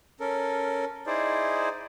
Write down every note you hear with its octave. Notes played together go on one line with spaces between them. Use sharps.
C#4 A4 A#4
D#4 E4 G#4 C5 D5